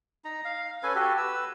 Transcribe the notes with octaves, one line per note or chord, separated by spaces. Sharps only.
D#4 A#5
F5
C#4 A4 B4 G#5
F#4 G4 A4
B4 E6